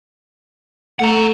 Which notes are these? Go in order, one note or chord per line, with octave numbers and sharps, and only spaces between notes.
A3 F#5 A#5